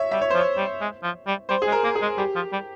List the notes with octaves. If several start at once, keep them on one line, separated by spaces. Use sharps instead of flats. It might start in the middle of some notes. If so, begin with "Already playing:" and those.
Already playing: C#5 E5
G3 E5
C#5
F3 C5
C#5
G3
G#3
F3
G3
G3 C5
G#4
G#3
A#4
A#3
G#4
G#3
G3 G4
F3
G3